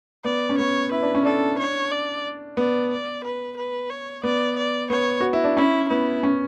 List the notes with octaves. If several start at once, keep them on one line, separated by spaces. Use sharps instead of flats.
B3 D5
C#4
B3 C#5
E4 B4
D4
C#4
D4 A4
C#5
D5
B3 D5
D5
B4
B4
C#5
B3 D5
D5
B3 C#5
F#4
E4
D4
C#4 E4
B3 E4
C#4